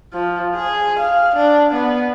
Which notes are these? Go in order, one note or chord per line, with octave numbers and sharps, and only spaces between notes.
F3
G#4
F5
D4
B3